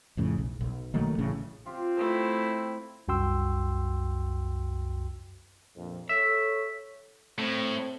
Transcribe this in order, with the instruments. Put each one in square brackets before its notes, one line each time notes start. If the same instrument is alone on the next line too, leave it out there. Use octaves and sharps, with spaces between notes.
[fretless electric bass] F2 A2 C#3
B1
B1
D#3 F#3 A3 A#3
A1 A2 C#3
[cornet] C4 [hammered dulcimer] F4 G4
[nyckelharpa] A3 E4 [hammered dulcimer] C5 C6
[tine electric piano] C2 F#2 F#4 G5 C6 E6
[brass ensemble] A#1 F2
[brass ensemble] A4 C#5 [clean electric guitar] E5
[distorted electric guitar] A2 [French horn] C4